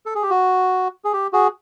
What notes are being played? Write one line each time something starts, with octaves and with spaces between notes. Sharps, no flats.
A4
G#4
G4
F#4
G#4
G4
F#4 G#4